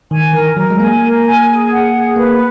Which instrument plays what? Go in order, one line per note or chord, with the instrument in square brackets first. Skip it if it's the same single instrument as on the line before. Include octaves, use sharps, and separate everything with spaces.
[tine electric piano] D#3 [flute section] G#5
[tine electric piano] E3 [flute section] A#4
[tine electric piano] F#3 [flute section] A#4
[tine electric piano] G#3
[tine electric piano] A#3 [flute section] G#5
[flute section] A#4
G#5
G#4
F#5
G#4
[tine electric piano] A#3 [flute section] B4